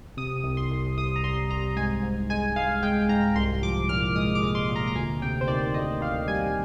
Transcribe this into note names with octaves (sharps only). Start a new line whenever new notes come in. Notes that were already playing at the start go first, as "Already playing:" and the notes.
C3 D#6
C2
C6
C2
C2 D#6
A#5
C2 C6
C2 A#5
G#2 G#5
G#2
G#3 G#5
G#3 F5
G#3 G5
G#2 A#5
C2 C6
F3 D6
A#2 F6
G#3 D#6
D6
G#3
C6
A#2
A#5
A#5
D2 G#5
C3 G5
C5
D#3 D5
D2 D#5
D#3 F5
G3 G#5